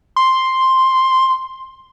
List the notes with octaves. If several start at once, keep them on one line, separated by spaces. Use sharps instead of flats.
C6